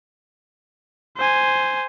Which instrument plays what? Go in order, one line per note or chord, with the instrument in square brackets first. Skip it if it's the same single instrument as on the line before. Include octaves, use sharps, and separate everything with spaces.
[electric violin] C5 G#5